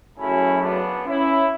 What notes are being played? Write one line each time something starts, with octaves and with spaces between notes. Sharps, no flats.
F#2 C#3 F#3 A3 C#4 E4
B3 D4
C#4 E4